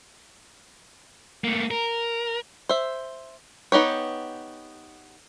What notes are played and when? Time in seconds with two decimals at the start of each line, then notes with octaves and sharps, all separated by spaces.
1.44 A3 A#3
1.71 A#4
2.69 C5 E5
3.72 B3 D#4 G4 C#5